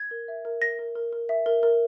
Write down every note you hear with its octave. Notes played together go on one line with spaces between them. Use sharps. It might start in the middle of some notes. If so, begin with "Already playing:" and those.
Already playing: G#6
A#4
E5
A#4
A#4 A#6
A#4
A#4
A#4
E5
A#4
A#4